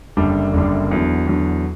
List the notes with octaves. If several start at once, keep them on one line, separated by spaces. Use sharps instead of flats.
F#1 F#2 D3 G3 D4
F#1 F#2 D3 G3 D4
E2 D3 F#3
E2 D3 F#3